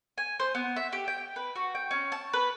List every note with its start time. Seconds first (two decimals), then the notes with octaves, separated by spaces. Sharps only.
0.18 G#5
0.40 C5
0.55 B3
0.76 E5
0.93 G4
1.08 G5
1.36 B4
1.56 F#4
1.75 G5
1.91 C#4
2.12 A5
2.33 B4